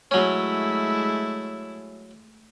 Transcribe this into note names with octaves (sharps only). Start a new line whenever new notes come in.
F#3 G#3 A3 C#4 E4